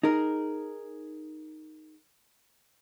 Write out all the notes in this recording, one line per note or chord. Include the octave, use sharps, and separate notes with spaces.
D#4 G#4 A#4